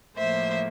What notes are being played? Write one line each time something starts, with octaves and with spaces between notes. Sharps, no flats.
A2 F3 A#3 C5 E5